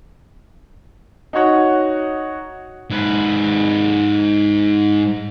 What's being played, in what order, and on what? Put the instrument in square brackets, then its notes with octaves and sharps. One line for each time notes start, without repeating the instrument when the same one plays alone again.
[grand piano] D#4 F#4 C#5 F#5
[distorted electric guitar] G#2 B4